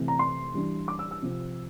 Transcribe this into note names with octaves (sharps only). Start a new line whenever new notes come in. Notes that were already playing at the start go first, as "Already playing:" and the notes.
Already playing: C3 E3 A3 C4
A#5
C6
E3 G3 D4
D6
E6
E6
C3 F3 C4